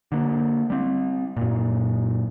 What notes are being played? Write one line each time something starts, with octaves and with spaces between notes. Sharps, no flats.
D3 A#3
G3 C4
F#2 A#2